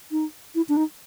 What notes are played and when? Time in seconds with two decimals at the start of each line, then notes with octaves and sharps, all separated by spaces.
0.12 D#4
0.55 E4
0.69 D4
0.77 D#4